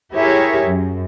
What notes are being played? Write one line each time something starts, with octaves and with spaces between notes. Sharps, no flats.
E4 G4 G#4 A#4 C#5 E5
F#2